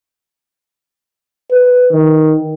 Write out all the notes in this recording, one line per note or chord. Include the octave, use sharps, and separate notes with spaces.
B4
D#3